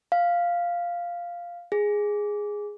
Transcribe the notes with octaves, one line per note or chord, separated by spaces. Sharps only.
F5
G#4